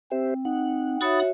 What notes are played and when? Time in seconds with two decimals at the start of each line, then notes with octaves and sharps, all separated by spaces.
0.11 C4 G4 C5 E5
0.45 D#4 F#5
1.01 F#4 C#5 E5 B5 D#6 A6